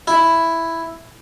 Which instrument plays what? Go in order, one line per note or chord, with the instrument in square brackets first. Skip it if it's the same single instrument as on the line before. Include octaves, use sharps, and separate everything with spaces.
[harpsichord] E4